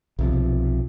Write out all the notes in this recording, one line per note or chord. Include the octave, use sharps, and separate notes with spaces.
B1 C3 F3